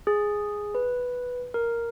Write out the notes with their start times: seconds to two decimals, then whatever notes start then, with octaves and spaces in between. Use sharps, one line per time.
0.07 G#4
0.75 B4
1.54 A#4